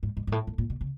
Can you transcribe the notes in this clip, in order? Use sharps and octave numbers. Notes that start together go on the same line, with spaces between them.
G#2
G#2
G#2
A2
A2
A#2
B2
C#3